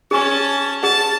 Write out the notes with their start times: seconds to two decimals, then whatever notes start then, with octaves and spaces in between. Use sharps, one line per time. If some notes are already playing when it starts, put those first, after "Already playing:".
0.11 C#4 G#4 G#5 A5 C#6
0.83 G#4 F#5 A5